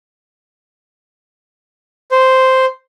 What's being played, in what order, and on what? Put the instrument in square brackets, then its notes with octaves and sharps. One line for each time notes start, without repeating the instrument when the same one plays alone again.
[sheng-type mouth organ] C5